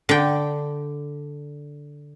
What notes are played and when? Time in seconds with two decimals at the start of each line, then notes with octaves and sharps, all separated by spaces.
0.09 D3 G5